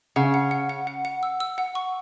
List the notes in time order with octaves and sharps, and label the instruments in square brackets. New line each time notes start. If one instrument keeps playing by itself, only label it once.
[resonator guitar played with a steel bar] C#3 [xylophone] F#5
[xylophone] F#5
F#5
F#5
F#5
F#5
E6
E6
F#5
C#6